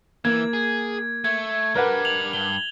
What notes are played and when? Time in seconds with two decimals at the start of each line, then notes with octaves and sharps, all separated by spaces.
0.25 E3 A#3 G#6
0.53 G#4
1.24 A3 G#6
1.75 G3 D4 A#4 B4 F#5
2.05 F7 F#7
2.33 G2 G7